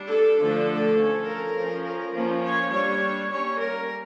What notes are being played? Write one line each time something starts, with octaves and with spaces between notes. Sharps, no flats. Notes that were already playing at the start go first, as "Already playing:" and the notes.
Already playing: G3 D4
A4
D3 F3 A3 D4
F3 C#4
A#4
F3 C#4
A#4
F3 A#3 C#4
C#5
G3 D4 C#5
G3 A#3 C#4 C#5
A#4